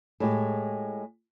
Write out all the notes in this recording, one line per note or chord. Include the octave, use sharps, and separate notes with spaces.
A2 G#3 G4